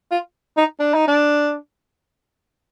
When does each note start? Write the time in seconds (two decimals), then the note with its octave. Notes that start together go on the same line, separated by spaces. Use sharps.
0.11 F4
0.57 D#4
0.80 D4
0.94 D#4
1.08 D4